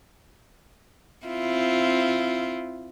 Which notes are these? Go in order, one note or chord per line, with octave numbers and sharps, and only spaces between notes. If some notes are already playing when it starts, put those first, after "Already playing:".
C4 E4 F4